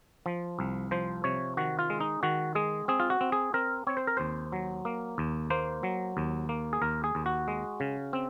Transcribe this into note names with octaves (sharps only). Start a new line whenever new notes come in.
F3
C2
F3 C5
C3 C#5
D#3 F#4
F4
G#3
D#4
D#3 F#4
G#3 G#4
C4 G#4
F4
F#4
C4
G#4
C4 A#4
C4 C#5
C5
A#4
D#2 C5
F#3
A#3
D#2
A#3 C5
F#3
D#2
A#3
G#4
D#2 A#4
G#4
D#2
F#4
G#3
C#3
C4